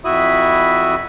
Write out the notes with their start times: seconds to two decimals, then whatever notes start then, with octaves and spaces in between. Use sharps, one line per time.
0.05 F2 E4 F#4 E5 B5 D#6